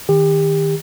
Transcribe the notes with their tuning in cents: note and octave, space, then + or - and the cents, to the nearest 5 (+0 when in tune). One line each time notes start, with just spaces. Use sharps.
D#3 +0 G4 +30